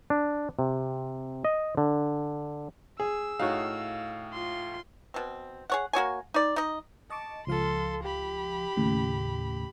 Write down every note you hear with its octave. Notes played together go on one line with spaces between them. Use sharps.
D4
C3
D#5
D3
G#4 E6
A2 D#4 F#4 C#5 F5
F4 C6
B2 C4
G#4 C#5 F#5
A#3 F#4 C#5 G#5
D#4 D5
D#4 D#5
D#5 A5 C#6 D6
C#2 F3 A4 F5 C6
G4 B5
D#2 A2 C#3